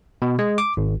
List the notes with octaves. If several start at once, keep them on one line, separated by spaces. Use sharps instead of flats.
B2
G#3
D6
G#1